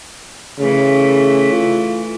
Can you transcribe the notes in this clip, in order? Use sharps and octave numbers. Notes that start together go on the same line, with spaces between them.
C#3 E3 A3
F4